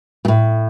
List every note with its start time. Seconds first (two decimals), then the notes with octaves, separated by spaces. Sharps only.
0.25 A#2
0.28 A2